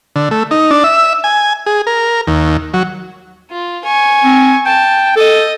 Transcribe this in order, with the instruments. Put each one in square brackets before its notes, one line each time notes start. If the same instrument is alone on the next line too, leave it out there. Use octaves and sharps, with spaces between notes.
[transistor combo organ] D3
A3
D#4
D4
E5
G#5
G#4
A#4
D#2
F#3
[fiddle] F4
G#5 C#6
[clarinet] C4
[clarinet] G5 [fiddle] A5
[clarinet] A4 [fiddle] D#5